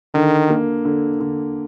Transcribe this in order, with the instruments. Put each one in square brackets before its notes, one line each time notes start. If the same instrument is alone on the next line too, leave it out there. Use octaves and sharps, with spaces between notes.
[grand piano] D3 [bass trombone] D#3
[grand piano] A#3
D3
D3